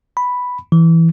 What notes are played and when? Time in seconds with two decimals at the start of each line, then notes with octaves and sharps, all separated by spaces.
0.17 B5
0.72 E3